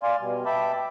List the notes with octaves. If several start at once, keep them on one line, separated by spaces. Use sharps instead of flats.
D5 F5 G#5 C6
B2 G3
E5 G5 A5 B5 D6